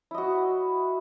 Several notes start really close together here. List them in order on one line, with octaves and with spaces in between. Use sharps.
E4 D#5 F#4